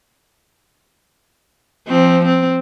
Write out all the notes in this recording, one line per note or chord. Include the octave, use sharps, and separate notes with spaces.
F3 C4
C4